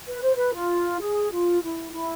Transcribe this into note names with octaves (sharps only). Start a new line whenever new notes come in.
B4
C5
B4
F4
G#4
F4
E4
E4